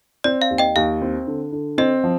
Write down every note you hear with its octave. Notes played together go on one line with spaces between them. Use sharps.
C4 D5
F5
D#2
D#5 G5
D#2 F5
C4
D3
D3
C4 D#5
F3